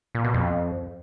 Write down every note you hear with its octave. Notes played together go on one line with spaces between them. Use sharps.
A#2
B2
F2